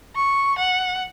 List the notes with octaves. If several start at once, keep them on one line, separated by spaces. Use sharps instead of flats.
C#6
F#5